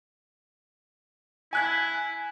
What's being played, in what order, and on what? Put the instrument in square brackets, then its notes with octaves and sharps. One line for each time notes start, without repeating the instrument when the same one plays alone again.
[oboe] E4 [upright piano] G#5 F#6 G#6